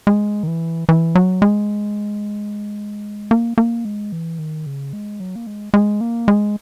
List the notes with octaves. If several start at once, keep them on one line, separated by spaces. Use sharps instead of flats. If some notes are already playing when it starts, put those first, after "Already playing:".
G#3
D#3
E3
E3
F#3
G#3
A#3
A#3
G#3
E3
D#3
C#3
G#3
F#3
A#3
G#3
G#3
A#3
G#3